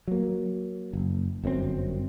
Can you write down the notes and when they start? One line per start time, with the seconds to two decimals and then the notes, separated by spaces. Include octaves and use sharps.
0.08 F#3 A#3
0.93 F#1
1.44 G1 F#2 A2 C4